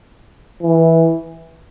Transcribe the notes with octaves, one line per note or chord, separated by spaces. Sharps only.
E3